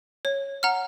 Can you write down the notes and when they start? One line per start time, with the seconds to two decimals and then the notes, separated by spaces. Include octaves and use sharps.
0.25 C#5
0.63 F#5 A#5 F6